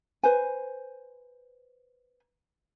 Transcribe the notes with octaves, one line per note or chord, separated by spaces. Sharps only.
B4 C5 G#5